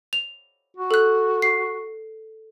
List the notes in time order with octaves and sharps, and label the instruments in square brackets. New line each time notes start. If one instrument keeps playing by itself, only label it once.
[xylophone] F7
[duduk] F#4
[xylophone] A4 F#6
C7